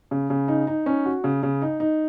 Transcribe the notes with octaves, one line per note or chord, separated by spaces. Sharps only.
C#3
C#3
D#4
D#4
C#4
F#4
C#3
C#3
D#4
D#4